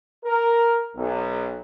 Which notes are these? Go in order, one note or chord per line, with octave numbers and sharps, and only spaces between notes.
A#4
B1